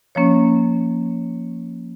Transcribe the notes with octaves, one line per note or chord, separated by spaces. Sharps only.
F3 A#3 C#4 C#5